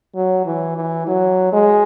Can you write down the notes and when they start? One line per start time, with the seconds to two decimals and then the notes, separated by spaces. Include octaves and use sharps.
0.15 F#3
0.46 E3
0.76 E3
1.07 F#3
1.53 G#3